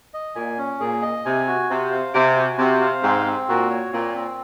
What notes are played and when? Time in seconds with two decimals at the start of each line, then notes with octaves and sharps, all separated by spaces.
0.14 D#5
0.35 A#2 G#5
0.58 C#4
0.80 A#2 G#4
1.02 D#5
1.25 C3 G#5
1.47 F#4
1.69 C3 C5
1.91 F5
2.14 C3 G#5
2.36 F#4
2.58 C3 C5
2.81 F5
3.03 G#2 C4
3.26 C4
3.48 A#2 F#4
3.70 C#5
3.92 A#2 C4
4.14 C4